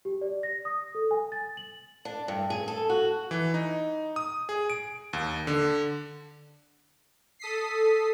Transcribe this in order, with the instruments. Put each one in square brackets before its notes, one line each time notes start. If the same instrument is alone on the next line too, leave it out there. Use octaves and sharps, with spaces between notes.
[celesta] G4
D5
A#6
D#6
A4
G#5
A6
F#7
[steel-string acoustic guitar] D4
G2
G#4
A4
F#4
[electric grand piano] E3
D#4
D#6
G#4
D7
D#2
D3
[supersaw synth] A4 D#6 B6 C7